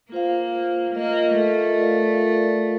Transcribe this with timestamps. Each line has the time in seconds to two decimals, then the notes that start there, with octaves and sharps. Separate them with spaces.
0.12 A#3 F4 C5 F5
0.94 A#3 F4 A#4 D#5
1.36 A3
1.78 F4 A#4 D5 F5